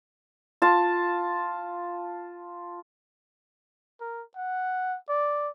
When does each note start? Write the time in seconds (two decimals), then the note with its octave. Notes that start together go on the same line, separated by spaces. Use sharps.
0.62 F4 A5
4.01 A#4
4.36 F#5
5.09 D5